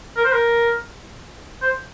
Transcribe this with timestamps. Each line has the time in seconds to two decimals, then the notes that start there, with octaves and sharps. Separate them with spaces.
0.17 A#4
0.24 C5
0.33 A#4
1.62 C5